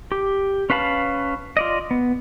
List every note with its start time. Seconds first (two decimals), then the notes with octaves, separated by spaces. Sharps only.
0.12 G4
0.70 C#4 B4 F5 A5 B5
1.57 F4 D5 D#5
1.91 B3